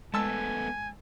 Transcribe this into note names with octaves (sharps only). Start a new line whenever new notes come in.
G#3 A3 B3 G#5 A5 E6